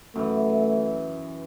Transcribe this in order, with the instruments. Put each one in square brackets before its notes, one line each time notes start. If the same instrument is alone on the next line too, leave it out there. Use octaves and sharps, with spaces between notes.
[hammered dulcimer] F#2 E3 [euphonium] A3